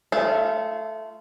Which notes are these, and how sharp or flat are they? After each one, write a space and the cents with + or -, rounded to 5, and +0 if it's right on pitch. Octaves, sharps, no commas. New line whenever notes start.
A3 +0 F4 -20